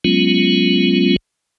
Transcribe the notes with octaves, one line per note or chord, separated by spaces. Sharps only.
F#3 G#3 B3 C#4 F4